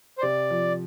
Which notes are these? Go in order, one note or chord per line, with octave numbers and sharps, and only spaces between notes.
C5
C3 D5
F3